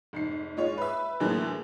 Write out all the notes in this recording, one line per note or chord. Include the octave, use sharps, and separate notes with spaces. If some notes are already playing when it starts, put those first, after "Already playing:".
F1 G#2 C7
G#3 F4 C#5
B4 E5
A2 D3 E3 F#3 A#3 G#4